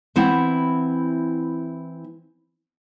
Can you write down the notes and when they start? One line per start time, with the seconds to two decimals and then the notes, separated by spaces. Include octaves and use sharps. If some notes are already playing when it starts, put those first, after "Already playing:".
0.16 E3 C4 E4 F#5